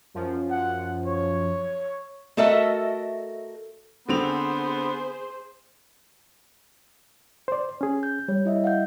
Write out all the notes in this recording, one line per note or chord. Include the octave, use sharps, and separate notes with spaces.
F#2 F3
F#5
C#5
A3 F#4 A4 A#4 D#5 E5
D3 B3 C4 G#4 C5 F7
C5 D5
C#4 G#4
G6
G3 C#5
E4 D#5 E5
F5 F#5 G6